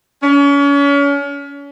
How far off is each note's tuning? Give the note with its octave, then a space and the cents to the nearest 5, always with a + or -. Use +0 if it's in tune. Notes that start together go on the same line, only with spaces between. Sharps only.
C#4 +35